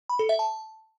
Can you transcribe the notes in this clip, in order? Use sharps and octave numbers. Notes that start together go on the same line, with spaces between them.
B5
A4
E5
A5